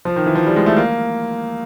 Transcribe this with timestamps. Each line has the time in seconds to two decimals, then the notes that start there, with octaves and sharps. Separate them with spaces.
0.05 F3
0.16 D#3
0.26 E3
0.35 F3
0.47 G3
0.56 G#3
0.66 A3
0.76 A#3